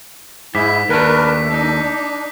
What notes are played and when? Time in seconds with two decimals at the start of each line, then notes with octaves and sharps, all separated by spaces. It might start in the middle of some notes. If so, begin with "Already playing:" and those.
0.55 G#2 E4 G#4 D6 B6
0.89 D#2 A3 D4 A#4 B4
1.51 D4 D#4